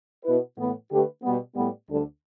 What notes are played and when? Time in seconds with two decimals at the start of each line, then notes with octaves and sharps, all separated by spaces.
0.24 B2 B3 E4 B4
0.57 A2 E3 B3
0.90 D3 A3 G4 B4
1.23 B2 G3 B3
1.56 A2 G3 B3
1.89 D2 D3 G3 D4 A4